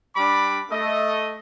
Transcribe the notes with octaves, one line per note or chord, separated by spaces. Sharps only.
G3 D4 B5 D6
A3 D#5